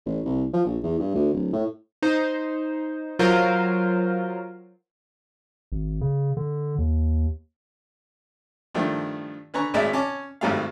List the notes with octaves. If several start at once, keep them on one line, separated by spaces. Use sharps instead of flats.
A1
C2
F3
A#1
E2
G2
D2
D1
A2
D#4 C5
F#3 F4 A#4 C5
G#1
C#3
D3
D#2
G2 D#3 F3 A3
D3 B4 G#5 A#5 C#6
G#1 A2 G#3 G#4 D5 E5
C#4 G#5 A5 D6
G#1 G#2 G3 A3 F5